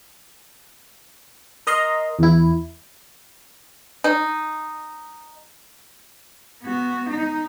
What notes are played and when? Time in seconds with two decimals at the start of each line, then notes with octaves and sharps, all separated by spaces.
1.67 A#4 D#5 A#5 C6
2.19 E2 E4
4.04 D#4
6.63 B3 F#4
7.10 D#4